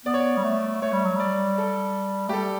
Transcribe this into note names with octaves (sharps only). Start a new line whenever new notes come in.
B3 D5
C#5
D5
G3
A3
A3 C#5
G3
F#3
G3 D5
A4
A3 G4
G3 A4